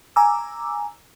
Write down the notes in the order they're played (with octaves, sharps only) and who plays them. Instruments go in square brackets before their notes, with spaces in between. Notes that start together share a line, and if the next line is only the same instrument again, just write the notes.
[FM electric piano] G#5 A#5 D6 E6